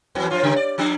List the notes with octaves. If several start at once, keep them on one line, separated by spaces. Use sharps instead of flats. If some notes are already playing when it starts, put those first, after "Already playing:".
E2 E3 F#3
F#2 F3 F4
C#3 G3
D5
F3 G3 D4